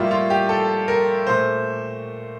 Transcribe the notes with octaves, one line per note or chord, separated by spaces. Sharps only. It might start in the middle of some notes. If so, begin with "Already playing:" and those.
Already playing: A2 G3 A#3 E4 F4
F4
G4
A4
A#4
A#2 A3 C5